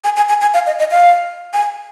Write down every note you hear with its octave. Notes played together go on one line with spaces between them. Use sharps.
G#5
G#5
G#5
G#5
F5
D#5
D#5
F5
G#5